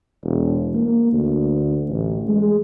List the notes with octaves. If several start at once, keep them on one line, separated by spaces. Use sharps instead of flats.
E1
A#3
D2
A1
G#3